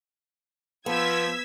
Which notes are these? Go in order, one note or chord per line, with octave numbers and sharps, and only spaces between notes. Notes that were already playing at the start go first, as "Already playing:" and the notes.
F3 B3 E6 G#6 B6